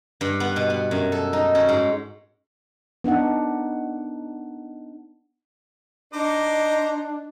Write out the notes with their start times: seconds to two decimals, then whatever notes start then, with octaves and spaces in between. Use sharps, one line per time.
0.21 G2
0.40 B3
0.56 B2
0.70 B3
0.91 F#2
1.12 A4
1.33 D#4
1.55 C#4
1.69 G#2
3.04 B3 D4 D#4 F#5
6.13 D4 D#4 C5 A#5 D6